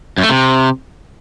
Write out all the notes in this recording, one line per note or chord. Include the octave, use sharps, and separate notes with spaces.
F#2
A3
C3